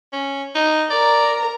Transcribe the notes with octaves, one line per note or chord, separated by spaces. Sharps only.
C#4
D#4
A#4 D5 A#5